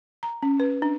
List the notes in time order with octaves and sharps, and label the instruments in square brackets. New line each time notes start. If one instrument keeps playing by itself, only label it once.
[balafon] A#5
C#4
B4
D4